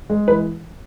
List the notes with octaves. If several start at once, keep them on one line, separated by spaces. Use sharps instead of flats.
G#3
E3 B4